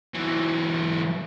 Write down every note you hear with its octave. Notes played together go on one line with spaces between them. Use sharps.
E3 F#3